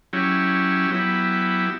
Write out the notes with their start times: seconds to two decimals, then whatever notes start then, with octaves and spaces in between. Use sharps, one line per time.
0.13 F#3 C#4 E4 G4
0.90 F#3 B3 E4 G4